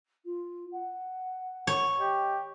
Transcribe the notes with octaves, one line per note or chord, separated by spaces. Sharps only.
F4
F#5
C#5
G4 D#5